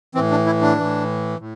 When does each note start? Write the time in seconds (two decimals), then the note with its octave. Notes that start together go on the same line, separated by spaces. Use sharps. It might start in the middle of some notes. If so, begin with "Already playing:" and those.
0.15 A2 E3 C4
0.31 D4
0.46 E4
0.62 D4
0.77 A2 E3
1.40 A2